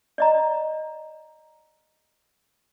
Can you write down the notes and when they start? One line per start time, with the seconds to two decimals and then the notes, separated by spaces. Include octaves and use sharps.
0.18 D5 D#5 A#5